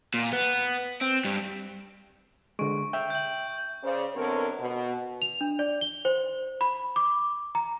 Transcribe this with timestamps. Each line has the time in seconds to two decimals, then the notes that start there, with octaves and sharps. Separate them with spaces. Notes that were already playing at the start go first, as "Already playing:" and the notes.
0.14 A#2
0.33 B3
1.01 C4
1.25 G2
2.59 D3 G#3 C#6 D7
2.93 E5 G5
3.10 G6 F#7
3.82 C#3 C5 D5
4.14 F#2 D3 B3 C4 A#4 C#5
4.58 B2
5.22 F7
5.41 D4
5.59 D5
5.81 G7
6.05 C5
6.61 B5
6.96 D6
7.55 A#5